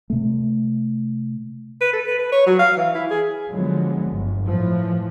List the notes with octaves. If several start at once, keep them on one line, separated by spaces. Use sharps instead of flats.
C3 A3
B4
A4
B4
B4
C#5
F#3
F5
E3
E4
G#4
D3 F3 F#3 G#3 B3
G1
A2 E3 F3